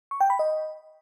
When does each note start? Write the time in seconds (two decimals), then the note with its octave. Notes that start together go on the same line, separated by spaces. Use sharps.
0.11 C#6
0.21 G5
0.30 B5
0.39 D#5